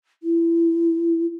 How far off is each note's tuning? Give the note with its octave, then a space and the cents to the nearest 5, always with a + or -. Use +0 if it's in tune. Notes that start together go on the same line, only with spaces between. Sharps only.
E4 +25